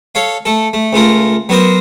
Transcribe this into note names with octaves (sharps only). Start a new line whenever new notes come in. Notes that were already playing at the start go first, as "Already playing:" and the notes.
A4 C#5 F5
A3 A4
A3
C#2 A3 F4 A#4
F#3 B3 F#4 A#4 C5